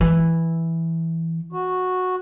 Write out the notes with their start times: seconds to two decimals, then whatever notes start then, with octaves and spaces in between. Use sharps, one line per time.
0.01 E3
1.52 F#4